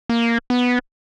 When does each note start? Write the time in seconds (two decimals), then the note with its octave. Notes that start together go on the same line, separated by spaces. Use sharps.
0.09 A#3
0.50 B3